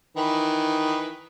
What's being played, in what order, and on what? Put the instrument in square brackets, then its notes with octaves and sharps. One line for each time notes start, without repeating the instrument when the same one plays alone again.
[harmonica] D#3 E3 B4